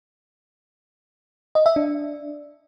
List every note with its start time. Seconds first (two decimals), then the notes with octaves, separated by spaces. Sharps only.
1.55 D#5
1.66 E5
1.76 D4